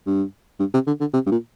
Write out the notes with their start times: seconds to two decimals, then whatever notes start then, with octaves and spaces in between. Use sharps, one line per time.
0.06 G2
0.60 G2
0.73 C3
0.87 D3
1.00 D3
1.13 C3
1.26 G2
1.31 A#2